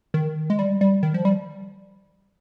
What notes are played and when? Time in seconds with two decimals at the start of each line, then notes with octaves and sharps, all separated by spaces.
0.14 D#3
0.50 G#3
0.59 G3
0.81 G3
1.03 D#3
1.14 F3
1.25 G3